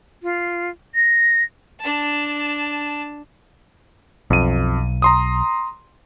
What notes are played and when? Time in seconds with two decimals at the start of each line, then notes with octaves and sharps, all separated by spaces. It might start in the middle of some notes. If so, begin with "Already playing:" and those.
0.23 F4
0.95 A#6
1.80 D4 A5
4.30 B1 F2 D#7
5.02 A#5 C6 D#6